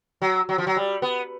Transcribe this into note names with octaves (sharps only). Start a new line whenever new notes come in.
F#3
F#3
F3
F#3
G3
B3